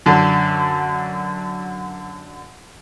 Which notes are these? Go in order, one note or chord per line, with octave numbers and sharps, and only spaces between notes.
F#2 D3